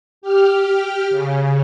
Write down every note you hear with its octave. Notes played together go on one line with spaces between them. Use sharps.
G4 F6
C#3